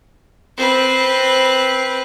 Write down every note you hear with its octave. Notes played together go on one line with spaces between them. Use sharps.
C4 B4